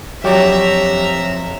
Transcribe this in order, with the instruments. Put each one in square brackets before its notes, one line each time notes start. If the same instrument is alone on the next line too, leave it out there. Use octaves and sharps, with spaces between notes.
[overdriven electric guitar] F2 [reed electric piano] F#3 G4 [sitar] D4 C#5 D5 [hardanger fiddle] E5 A#5